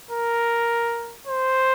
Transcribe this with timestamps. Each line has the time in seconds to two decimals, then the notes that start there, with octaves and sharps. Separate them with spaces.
0.11 A#4
1.27 C5